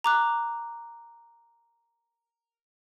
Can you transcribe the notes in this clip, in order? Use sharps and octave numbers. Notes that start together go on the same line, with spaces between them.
A#5 D6 F#6